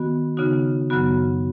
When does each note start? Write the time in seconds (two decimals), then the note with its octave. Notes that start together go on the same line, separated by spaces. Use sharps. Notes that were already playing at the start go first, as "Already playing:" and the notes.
Already playing: D#3 B3 F#4
0.37 C#3 B3 D#4 F#4
0.90 F#2 C#3 F#3 B3 F#4